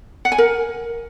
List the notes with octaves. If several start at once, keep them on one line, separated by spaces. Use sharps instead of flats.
F#5
G#5
A#4